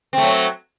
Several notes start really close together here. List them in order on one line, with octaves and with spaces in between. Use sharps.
C4 A3 F#3